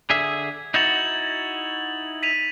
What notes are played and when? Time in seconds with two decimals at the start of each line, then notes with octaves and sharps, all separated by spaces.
0.10 D3 G#4 E5 G#6
0.74 D#4 E4 F#4 A6 F7 F#7
2.23 B6 D#7 F7